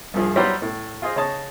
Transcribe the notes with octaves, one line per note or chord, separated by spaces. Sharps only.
C2 G2 F3 G#4
F#3 G3 E4 G4 B4 C5
A2
F4 G#4 C5 D#5
C#3 C#5 D#5 A5